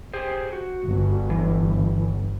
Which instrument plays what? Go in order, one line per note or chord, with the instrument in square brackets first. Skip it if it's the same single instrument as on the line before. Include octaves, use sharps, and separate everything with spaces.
[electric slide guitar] G4 G#4 C5
F#4
[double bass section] G1
[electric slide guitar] E3